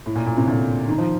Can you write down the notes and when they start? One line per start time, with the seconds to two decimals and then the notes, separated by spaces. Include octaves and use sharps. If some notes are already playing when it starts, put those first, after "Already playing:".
0.06 A2
0.15 A#2
0.26 A#2
0.37 A2 C3
0.47 A#2 D3
0.88 D#3
0.98 F3